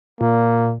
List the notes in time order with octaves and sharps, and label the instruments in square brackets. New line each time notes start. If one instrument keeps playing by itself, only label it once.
[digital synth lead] A#2 [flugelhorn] A#3